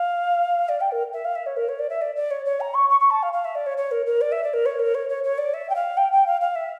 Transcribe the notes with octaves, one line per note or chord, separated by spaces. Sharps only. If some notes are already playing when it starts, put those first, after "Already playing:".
Already playing: F5
D5
G5
A#4
E5
F5
E5
C#5
A#4
C#5
D5
E5
D5
D5
C#5
C#5
A#5
C#6
C#6
C#6
A5
F5
F5
E5
D5
C#5
C#5
A#4
A#4
D5
E5
D5
A#4
C#5
A#4
C#5
C#5
C#5
D5
E5
G5
F5
G5
G5
F5
F5
E5